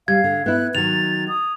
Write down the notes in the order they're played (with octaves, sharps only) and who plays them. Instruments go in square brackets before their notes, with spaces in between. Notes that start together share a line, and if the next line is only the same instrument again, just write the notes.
[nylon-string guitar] G3 [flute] F5 [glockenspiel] G#6
[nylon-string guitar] D3
[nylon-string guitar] B3 E4 [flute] F#6
[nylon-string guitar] D#3 F#3 [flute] A6 [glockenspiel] F7
[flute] D#6